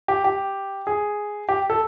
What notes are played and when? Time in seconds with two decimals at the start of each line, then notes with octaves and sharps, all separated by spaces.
0.08 G4
0.24 G4
0.87 G#4
1.49 G4
1.70 A4